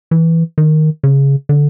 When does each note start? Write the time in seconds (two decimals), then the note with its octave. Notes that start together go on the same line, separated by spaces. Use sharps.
0.11 E3
0.58 D#3
1.03 C#3
1.49 D3